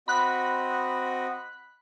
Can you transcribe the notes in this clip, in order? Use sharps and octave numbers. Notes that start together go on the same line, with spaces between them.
C4 F#4 D#5 B5 F#6